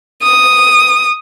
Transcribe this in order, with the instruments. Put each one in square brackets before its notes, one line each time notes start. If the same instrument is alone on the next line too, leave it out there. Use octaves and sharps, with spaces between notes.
[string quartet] D#6